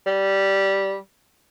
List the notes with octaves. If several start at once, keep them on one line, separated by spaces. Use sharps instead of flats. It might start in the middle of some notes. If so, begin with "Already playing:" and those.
G3